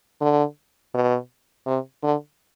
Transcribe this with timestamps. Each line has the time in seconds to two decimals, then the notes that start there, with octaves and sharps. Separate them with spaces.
0.21 D3
0.94 B2
1.67 C3
2.03 D3